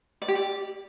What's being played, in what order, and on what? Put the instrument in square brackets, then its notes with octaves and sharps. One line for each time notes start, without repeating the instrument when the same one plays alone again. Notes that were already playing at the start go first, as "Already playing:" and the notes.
[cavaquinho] D5
G4
D5